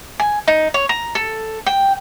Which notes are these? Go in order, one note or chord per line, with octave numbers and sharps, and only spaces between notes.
G#5
D#4
C#5
A#5
A4
G5